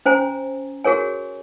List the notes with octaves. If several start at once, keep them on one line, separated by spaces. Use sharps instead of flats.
C#4 C5 G#5 A#5
F#4 G#4 A#4 C#5 G#5